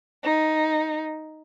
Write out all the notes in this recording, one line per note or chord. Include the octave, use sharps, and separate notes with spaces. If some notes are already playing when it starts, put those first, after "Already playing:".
D#4